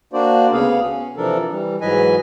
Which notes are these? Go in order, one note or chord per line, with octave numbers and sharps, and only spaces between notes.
A#3 D4 F#4 C5 D5
D2 C#3 B3 G#4 F5
C#4
C3 E3 F3 D4 A4 A#4
E3 G3
G#2 E3 F#3 B4 D#5 G#5